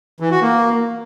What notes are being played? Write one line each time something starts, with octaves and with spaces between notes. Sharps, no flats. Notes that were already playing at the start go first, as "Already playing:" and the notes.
E3
F#4
A#3